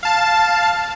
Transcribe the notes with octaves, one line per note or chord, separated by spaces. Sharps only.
F5 A5